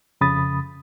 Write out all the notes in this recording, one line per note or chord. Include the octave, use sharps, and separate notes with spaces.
F2 C#3 B5 D#6 A6